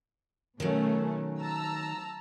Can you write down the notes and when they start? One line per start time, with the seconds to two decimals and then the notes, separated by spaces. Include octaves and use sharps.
0.60 B2 D#3 F#3 A3 C#4
1.40 A5 A#5 E6